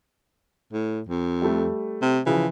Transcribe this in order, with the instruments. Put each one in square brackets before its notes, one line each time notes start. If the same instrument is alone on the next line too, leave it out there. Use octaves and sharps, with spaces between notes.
[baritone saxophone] A2
F2
[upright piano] G3 A3
[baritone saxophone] C3
[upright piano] C#3 F3 [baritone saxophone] E3